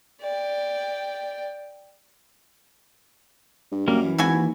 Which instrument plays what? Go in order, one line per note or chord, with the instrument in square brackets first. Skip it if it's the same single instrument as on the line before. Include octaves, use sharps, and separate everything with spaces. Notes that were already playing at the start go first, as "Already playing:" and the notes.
[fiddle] D5 G5
[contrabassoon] G2
[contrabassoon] F#2 [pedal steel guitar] G3 A#3 A#4
[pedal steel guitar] E3
[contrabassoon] G#1 [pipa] E4 F#4 G#5
[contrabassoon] D#2